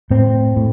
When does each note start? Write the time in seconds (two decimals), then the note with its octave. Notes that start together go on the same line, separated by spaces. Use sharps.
0.10 A2 C4
0.56 A2